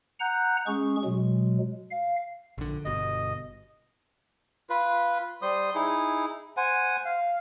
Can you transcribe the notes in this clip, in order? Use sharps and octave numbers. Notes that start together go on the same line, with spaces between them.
F#5 A#5 F#6 G6
G#3 C#4 G#4 C#6
B2 F#3 G#3
F5
A#1 D3
G1 B2 D#5
F4 B4
G3 C5 C6 D#6
D#4 E4 G#4
C5 F#5 G#5
F5